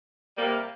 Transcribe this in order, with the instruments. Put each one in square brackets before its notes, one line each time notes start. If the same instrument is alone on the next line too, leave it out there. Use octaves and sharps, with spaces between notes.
[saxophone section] C3 G3 A#3